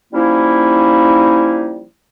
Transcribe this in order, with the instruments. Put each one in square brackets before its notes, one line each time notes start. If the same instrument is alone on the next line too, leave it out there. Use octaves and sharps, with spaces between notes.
[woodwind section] F3 G3 A#3 C#4 D#4 E4